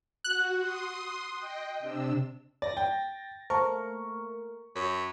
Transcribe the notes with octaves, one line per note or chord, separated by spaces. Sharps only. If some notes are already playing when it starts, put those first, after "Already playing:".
F#4 F#6
C6 D#6
D#5 G5
C3 D4 E6
D5 A6 A#6
G5
A3 A#3 A#4 C5 A5 C#6
F#2 B6